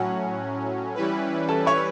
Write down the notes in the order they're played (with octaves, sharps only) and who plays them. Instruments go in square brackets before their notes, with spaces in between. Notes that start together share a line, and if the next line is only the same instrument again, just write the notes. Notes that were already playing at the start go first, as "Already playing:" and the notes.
Already playing: [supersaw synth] A2 F#3 C#4 [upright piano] F#4 F#5
[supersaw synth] E3 G3 C#4 E4 B4
[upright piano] A4 A5
C#5 C#6